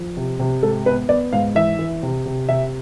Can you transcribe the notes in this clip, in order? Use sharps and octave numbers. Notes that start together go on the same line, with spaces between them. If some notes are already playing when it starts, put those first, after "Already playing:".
Already playing: F3
C3
C3
G#2 A4
B3 B4
B3 D5
G#2 F5
E3 E5
E3
C3
C3
C3 E5